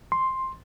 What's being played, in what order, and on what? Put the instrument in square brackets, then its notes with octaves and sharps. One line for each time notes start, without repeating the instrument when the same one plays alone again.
[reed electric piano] C6